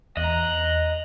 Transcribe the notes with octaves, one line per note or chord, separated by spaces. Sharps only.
E2 D#5 A#5 F#6